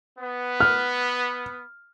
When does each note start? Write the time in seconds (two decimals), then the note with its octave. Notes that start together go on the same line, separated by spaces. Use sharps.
0.18 B3
0.60 F6